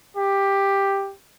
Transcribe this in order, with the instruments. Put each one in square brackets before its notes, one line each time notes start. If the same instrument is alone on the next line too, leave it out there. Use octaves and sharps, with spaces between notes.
[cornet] G4